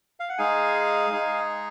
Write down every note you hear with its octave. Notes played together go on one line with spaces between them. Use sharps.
F5
F#5
G#3 D#4 G#4 F5 G#5
G#3 D#4 G#4